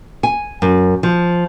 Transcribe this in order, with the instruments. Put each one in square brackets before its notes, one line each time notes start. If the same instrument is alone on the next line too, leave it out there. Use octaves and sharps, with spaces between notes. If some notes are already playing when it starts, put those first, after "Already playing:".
[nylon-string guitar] G#5
F#2
F3